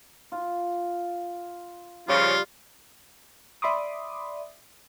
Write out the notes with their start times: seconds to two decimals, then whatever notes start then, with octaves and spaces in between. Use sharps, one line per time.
0.32 F4
2.08 C#3 F3 G3 F4
3.62 D5 E5 B5 C6 D6 D#6